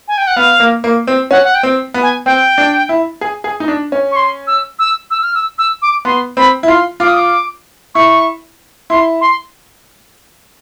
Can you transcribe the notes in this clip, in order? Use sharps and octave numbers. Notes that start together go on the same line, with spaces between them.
G#5
G5
F#5
B3 F5
A#3
A#3
C4
C#4 F#5
F#5
G5
C4
B3
G#5
C4 G5
D4
E4
G#4
G#4
D#4
D4
C#4
C#6
C6
E6
E6
E6
F6
E6
E6
D6
B3 C6
C4 B5
E4
F4 C6
F4 D6
D#6
D6
E4 C#6
E4 C6
C6